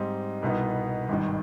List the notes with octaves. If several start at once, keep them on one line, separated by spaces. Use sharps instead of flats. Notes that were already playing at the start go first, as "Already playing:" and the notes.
Already playing: G#2 G3 C4 D#4
C2 B2 B3 D#4
G#1 G2 D#3